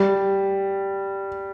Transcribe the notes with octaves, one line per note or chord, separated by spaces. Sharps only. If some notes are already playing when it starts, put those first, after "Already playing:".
Already playing: G3